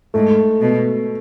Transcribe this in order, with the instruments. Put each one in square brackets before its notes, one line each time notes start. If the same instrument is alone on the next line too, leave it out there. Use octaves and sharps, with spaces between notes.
[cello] G#2 [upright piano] A3
[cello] B2